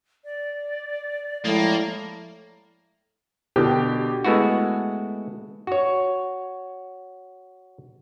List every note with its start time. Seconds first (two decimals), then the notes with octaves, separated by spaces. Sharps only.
0.25 D5
1.45 A2 F3 G#3 A#3 D#6
3.56 B2 D3 G4
4.25 G#3 A3 B3 E4 F#4
5.67 F#4 C#5